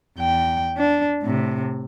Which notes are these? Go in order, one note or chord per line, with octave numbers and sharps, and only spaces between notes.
E2 G5
D4
A2 C3